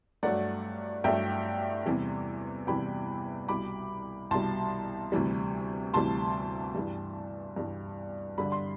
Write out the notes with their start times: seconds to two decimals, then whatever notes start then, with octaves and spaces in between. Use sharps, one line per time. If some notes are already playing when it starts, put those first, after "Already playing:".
0.23 G2 F#3 A3 D5 F#5
1.04 G2 F#3 A3 E5 G5
1.86 E2 C3 E3 G3
2.67 E2 C3 E3 G3 G5 B5
3.48 C2 B2 G3 B5 D6
4.31 C2 B2 G3 A5 C6
5.12 D2 C3 E3 G3
5.94 D2 C3 E3 G3 A5 C6
6.75 G2 E3 G3
7.56 G2 E3 G3
8.38 G2 D3 G3 B5
8.52 C6